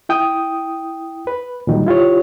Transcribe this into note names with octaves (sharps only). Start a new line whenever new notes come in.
E4 G5 D#6
B4
A#2 D#3 F#3 G3
E4 F4 G4 C#5